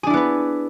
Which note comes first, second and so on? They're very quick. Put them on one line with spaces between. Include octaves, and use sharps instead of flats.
G#4 D4 E4 B3 B4